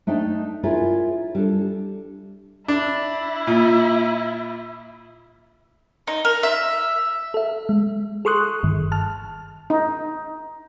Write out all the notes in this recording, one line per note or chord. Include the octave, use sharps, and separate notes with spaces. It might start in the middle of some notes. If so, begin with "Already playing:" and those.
A3 D4 D#4 D5 G5
E4 F4 G#4 A#4 C#5 D5
G3 D4 A4
D4 E4
A#2
D#4
A#4
E5
A4 E5
G#3
G#4 A4 C6 C#6 D#6 F#6
G1 G2 D#3
A5 F6
D#4